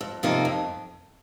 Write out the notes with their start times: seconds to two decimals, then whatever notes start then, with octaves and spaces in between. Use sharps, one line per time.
0.01 F2
0.23 C3 F3 A#3 D#4
0.45 F2